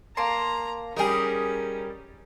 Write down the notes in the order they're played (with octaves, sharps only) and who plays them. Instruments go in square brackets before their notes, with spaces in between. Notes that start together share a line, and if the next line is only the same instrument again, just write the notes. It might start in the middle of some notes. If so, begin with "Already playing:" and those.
[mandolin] A#3 A5 C6 [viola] A#5
[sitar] G3 A#4 [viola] C#4 [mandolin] D#4 G#4